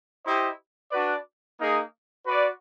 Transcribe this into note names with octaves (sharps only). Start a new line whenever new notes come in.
E4 G4 C5 D#5
D4 F#4 B4 D5
A#3 D#4 G#4
F#4 B4 D5